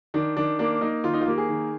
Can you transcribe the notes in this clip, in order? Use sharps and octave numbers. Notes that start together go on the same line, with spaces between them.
D#3 D4
D#3 D4
A#3 D4
A#3 D#4
D#3 F4
D#4
F4
A#3 G4
G#4
D#3